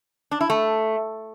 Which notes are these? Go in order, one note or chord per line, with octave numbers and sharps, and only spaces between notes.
D4
E4
A3